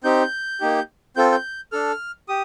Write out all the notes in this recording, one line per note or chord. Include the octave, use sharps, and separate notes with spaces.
C4 D#4 G4 G6
A#3 D#4 G4
C4 F4 A4 G6
G6
D4 A4 F6
G4 D#6